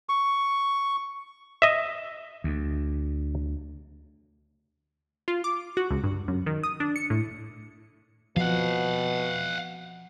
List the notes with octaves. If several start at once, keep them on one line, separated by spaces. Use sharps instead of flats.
C#6
D#5 E5
D2
F4
D6
F#4
C#2
G2
F#2
D#3
D#6
D4
C#7
A2
B2 F3 F5 F#5